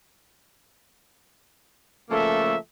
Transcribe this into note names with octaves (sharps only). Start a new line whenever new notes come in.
C#3 F3 A3 A#3 A4 E5